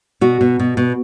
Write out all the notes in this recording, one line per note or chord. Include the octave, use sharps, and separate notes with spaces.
B2 F#4
B2
B2
B2